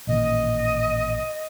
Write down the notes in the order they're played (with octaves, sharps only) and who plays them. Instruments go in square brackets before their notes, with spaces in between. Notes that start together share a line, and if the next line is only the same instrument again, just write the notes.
[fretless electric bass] A1 A#2 D#3 [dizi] D#5